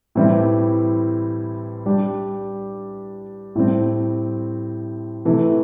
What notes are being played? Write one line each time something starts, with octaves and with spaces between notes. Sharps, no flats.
A2 E3 G3 C4 E4
G3 D4 G4
A2 G3 C4
C3 E3 A3 E4